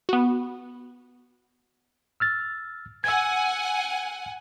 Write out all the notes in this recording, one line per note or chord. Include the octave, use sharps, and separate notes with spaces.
B3 F#4
E6 F6 A6
F#5 G#5 E6 G#6